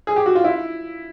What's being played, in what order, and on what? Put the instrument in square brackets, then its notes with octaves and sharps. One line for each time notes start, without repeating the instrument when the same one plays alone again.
[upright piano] G#4
G4
F#4
F4
E4